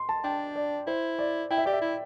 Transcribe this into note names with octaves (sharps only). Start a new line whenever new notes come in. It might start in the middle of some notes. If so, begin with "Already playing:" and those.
Already playing: C6
A5
D4 G5
D5
E4 C5
D5
E4 G5
E5
G4 D5
E5
E4